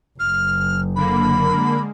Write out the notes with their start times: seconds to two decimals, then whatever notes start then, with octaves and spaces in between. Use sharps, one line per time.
0.19 F#1 F6
0.96 D3 A#3 B5
1.58 G#3